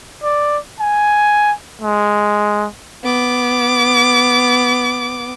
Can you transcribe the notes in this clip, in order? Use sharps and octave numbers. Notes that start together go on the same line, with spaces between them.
D5
G#5
G#3
B3 D6